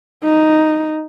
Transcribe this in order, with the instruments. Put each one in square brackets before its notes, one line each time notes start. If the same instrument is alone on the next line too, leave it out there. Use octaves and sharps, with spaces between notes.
[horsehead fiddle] D#4